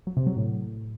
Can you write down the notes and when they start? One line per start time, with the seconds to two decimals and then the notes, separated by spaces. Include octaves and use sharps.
0.07 F#3
0.17 C3
0.27 F#3
0.37 A2